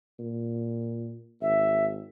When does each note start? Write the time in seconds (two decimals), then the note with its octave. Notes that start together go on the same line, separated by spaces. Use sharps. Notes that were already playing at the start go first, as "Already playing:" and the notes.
0.19 A#2
1.41 G#1 E5